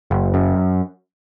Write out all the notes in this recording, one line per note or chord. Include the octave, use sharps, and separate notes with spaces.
F#1
F#2